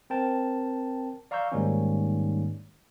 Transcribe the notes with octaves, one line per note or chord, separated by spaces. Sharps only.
C4 A#4 G5 A5
D5 F5 A#5 C#6 E6 G6
G#2 D#3 G3 G#3 A#3 C#4